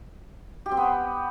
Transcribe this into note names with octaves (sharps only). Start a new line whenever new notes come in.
G4
C4
B3